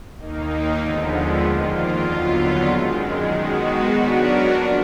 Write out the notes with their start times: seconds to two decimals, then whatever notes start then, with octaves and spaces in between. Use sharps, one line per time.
0.17 D#2 D#3 A#3 D#4
0.79 D#2 D3 F3 G#3 B3
1.40 F2 D#3 A#3 F4
2.04 D#2 D3 F#3 B3 F4
2.65 F#2 D#3 G#3
3.27 D#3 G#3 B3 D#4 F#4
3.90 F#3 B3 D4 F#4 A#4
4.52 F3 A#3 D4